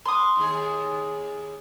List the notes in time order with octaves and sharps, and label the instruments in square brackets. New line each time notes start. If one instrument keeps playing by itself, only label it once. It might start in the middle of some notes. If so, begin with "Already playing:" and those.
[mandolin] C6 D#6
[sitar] D#2 G#4